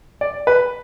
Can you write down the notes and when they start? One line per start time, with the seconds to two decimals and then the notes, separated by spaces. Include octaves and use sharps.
0.21 D5
0.47 B4